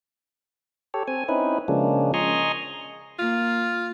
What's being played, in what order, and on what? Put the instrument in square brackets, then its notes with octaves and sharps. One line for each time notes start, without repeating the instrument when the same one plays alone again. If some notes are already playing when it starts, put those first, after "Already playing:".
[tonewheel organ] G4 A4 C#5
C4 G#5
C4 C#4 D#4 E4 B4
C#3 F3 G#3 A#3 C#4 D4
D#5 G#5 A#5 C6 C#6
[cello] A#3 [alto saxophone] F4